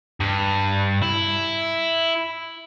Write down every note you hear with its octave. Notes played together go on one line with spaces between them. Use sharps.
G2
E4